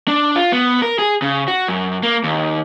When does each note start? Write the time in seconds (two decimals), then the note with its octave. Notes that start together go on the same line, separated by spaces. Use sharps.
0.08 D4
0.36 F4
0.52 B3
0.82 A#4
0.99 G#4
1.22 C#3
1.48 F#4
1.68 F#2
2.03 A#3
2.23 D#2